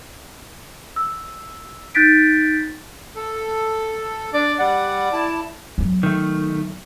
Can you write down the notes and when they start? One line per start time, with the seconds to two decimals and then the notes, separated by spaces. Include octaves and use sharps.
0.96 E6
1.95 D#4 F#6 G6 A6 B6 D7
3.16 A4
4.34 D4 D5
4.59 G3 D5 F#5
5.13 E4 A5
5.78 F#3 B3
6.03 D#3 A3